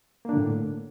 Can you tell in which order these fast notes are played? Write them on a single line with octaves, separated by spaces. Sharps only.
A#3 D4 D3 A2